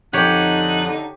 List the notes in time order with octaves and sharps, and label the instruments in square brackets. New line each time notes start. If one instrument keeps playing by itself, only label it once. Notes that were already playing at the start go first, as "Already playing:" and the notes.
[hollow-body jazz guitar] F2 [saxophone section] D3 D#4 [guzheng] G4 C#5 [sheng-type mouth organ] F#6